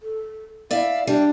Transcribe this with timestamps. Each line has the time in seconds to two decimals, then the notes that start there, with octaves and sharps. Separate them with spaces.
0.03 A4
0.71 E4 D5 E5 F5
1.07 G3 D4 G4